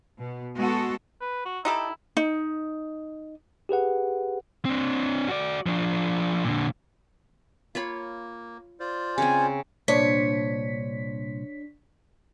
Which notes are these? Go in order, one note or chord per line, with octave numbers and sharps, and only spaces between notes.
B2
G#3 B3 F#4 A4
B4
F#4
D#4 E4 G4 A4
D#4
G4 G#4 B4 F#5
C4 D4
F#4 D5
F3 D4
A#2 D3
A#3 F4 C#5 B5
F4 C5 D5
C#3 C4 G#5
C2 A#2 D4 C5 C#5 B6